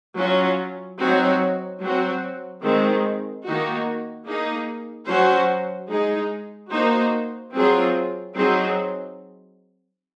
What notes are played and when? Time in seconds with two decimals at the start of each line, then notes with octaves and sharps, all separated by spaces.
0.19 F#3 C#4 F4
1.01 F#3 C4 D#4 F#4 C#5
1.82 F#3 C4 F#4
2.64 D#3 G#3 C4
3.46 D#3 A#3 D#4 F#4
4.27 A#3 D#4 G#4
5.09 F#3 C#4 F#4 C5
5.91 G#3 D#4 G#4
6.72 A#3 D#4 F#4 C5
7.54 F#3 C4 F4 G#4
8.36 F#3 C4 D#4 G#4